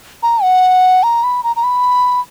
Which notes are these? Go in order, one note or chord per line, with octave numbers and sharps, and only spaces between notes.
A#5
F#5
A#5
B5
A#5
A#5
B5